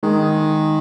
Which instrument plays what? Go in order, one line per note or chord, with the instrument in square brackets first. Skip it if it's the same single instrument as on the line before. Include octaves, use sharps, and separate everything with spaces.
[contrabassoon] D#3 [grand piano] G#3